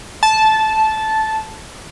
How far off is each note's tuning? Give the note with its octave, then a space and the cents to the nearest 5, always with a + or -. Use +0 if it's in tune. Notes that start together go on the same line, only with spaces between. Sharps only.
A5 -10